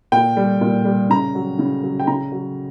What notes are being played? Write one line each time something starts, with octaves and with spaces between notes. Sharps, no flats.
A#2 G5
G3
A#2
G3
C#3 A#5
F#3
C#3
F#3
G5
C#3 A#5
F#3